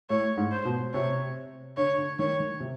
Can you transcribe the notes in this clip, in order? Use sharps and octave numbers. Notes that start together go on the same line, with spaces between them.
A2 C#5
G#2
C5
B2
C3 C#5
D3 C#5
D3
D#3 C#5
D#3
C3